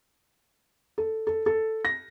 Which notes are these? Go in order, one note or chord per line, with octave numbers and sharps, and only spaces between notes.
A4
A4
A4
A#6